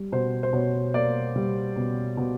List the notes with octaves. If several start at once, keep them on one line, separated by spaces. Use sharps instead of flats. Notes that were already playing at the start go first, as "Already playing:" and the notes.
Already playing: G3
B2 C5
C5
B2 C#5
A#3 D5
G3
B2
B2